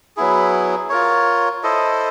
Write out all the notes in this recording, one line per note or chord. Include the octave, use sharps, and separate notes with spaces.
F#3 B3 E4 G#4
F4 A#4 C#5
E4 A4 C5 D#5